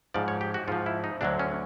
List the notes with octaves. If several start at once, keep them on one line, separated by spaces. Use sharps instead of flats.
G#2 F3 D5
C#5
G4
F#4
G#2 F3 F4
E4
D#4
D2 D3 F#3 D4
C#4